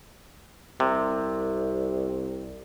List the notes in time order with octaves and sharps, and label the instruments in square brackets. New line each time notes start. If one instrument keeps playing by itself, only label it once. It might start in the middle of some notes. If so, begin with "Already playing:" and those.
[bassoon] C2 [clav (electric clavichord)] C3